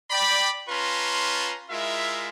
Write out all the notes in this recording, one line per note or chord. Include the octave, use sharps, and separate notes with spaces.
D5 G5 B5
C#4 F4 B4 A5 A#5 C6
G#3 E4 F4 A#4 E5